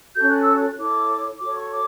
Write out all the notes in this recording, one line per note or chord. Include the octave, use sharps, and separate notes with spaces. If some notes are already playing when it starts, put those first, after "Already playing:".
C#4 F#4 A4 G6
F#6
E6
F#6
E4 A4 C#5 D6
F#4 A4 C#5 D6
C#6
D6